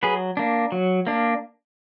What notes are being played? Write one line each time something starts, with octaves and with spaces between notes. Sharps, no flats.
F#3 G#4 B4
A#3 D4
F#3
A#3 D4